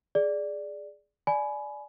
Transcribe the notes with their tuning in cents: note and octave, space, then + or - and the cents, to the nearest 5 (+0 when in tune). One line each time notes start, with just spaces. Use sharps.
G#4 +5 D5 +0
D5 +0 G#5 +25 B5 +0